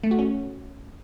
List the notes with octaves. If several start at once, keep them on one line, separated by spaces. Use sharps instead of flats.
A3
F#4
C#4